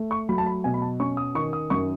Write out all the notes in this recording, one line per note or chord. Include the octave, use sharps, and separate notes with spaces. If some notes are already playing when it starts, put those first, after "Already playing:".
Already playing: A3
C#6
F#3 B5
A5
B5
B2 G#5
B5
A5
C#4 C#6
D#6
D#3 C#6
D#6
F#2 C#6